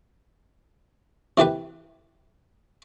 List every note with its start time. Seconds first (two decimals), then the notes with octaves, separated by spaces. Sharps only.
1.37 C3 E3 G4 B4